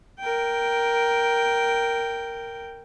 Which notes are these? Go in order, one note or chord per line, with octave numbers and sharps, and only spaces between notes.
A#4 G5